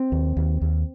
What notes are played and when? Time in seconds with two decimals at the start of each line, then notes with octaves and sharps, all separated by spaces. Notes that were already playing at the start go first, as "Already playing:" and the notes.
Already playing: C4
0.12 D#2
0.37 D#2
0.62 D#2